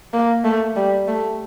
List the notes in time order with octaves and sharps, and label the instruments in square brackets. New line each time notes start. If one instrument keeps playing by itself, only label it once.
[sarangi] A#3
A3
G3
A3